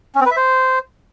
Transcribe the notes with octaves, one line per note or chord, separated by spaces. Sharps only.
C#4
C4
B4
E5
C5